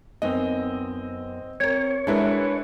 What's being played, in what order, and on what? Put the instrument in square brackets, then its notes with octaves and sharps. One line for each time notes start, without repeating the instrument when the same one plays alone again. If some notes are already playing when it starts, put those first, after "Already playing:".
[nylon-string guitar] F#2 B3 D#4 [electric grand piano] C4 D#5
[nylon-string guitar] C4 A#4 [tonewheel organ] C#5
[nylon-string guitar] G#3 F#4 A#4 [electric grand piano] D4 E4 B4